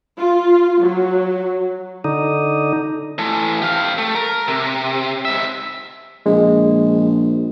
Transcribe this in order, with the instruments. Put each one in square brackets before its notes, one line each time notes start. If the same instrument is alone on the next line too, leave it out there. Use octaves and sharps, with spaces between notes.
[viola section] F4
F#3
[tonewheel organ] D3 D#4
[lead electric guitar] E3 A3
G4 F5
A3
A#4
C3
G#2 E5
[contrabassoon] A#1 [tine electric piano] G#3